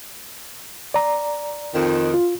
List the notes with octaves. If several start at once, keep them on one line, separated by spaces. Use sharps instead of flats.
D5 A#5
F2 D#3
F4